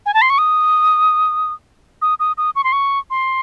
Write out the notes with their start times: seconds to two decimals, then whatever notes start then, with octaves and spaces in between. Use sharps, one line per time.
0.06 G#5
0.14 A5
0.22 C6
0.30 C#6
0.38 D#6
2.02 D#6
2.20 D#6
2.38 D#6
2.56 C#6
2.64 C6
2.73 C#6
3.10 C6